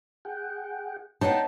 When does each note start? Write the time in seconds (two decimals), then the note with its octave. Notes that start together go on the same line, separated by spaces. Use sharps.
0.25 G#4 F#5 G5
1.21 B3 D4 D#4 C#5 F#5 G5 A5